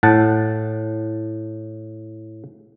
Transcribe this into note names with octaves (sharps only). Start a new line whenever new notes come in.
A2 F#5 A5